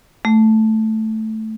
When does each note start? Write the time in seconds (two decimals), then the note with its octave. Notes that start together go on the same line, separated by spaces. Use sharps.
0.25 A3